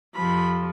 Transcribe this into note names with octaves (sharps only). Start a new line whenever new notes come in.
F2 C3 F3 B5